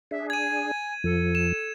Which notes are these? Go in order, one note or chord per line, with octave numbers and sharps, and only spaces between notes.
D4 G#4 E5
G#5 G#6 D#7
F2 F3 A4
E7